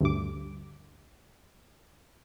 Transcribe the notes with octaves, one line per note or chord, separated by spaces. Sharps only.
D2 G2 D6